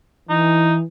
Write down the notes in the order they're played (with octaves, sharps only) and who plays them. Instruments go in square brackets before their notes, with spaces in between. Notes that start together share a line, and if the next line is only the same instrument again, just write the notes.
[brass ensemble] E3 [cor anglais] D#4